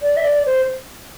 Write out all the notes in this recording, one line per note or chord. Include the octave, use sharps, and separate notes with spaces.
D5
E5
D5
C5